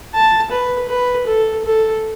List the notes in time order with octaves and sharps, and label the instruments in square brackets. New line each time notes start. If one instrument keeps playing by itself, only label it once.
[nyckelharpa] A5
B4
B4
A4
A4